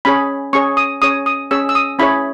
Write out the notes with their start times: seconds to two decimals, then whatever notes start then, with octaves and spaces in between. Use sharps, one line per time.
0.05 C#4 G#4 C#5 B5
0.53 C#4 G#4 C#5 C#6
0.77 D#6
1.02 C#4 G#4 C#5 D#6
1.26 D#6
1.51 C#4 G#4 C#5 E6
1.69 E6
1.75 D#6
1.99 C#4 E4 G#4 C#5 B5